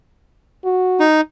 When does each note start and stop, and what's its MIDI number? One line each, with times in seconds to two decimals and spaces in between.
0.64 1.05 66
1.00 1.21 63